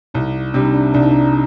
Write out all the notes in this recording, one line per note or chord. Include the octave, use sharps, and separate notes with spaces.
C2 D#4
C3 G3 D4
D#4
D4
C2 D4
D#4
D4